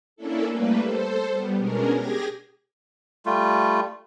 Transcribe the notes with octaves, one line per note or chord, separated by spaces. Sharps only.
A#3 C#4 D4 E4 A4
G3 A3 A#3 B4
A4 C5
G3 B3
B2 G#3 C#4 D4 A#4
G4 G#4 G#5 A#6
G3 A3 F4